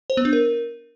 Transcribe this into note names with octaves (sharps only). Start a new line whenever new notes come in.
C5
B3
D4
A#4